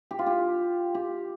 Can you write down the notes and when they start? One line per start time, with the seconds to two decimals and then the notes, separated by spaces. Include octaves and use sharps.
0.11 G4
0.19 F4
0.26 G4
0.95 G4